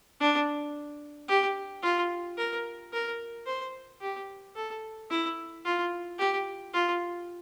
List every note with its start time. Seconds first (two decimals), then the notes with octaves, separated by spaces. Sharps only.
0.20 D4
1.28 G4
1.83 F4
2.38 A#4
2.93 A#4
3.46 C5
4.01 G4
4.56 A4
5.10 E4
5.65 F4
6.19 G4
6.74 F4